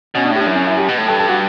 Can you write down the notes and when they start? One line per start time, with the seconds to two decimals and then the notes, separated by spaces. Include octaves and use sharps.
0.15 B2 C#4
0.25 D4
0.31 A2 G4
0.41 D4
0.47 F#2 E4
0.56 C#4
0.67 E4
0.77 G4
0.88 B2
0.98 A2
1.08 G2 A4
1.19 A4
1.29 F#4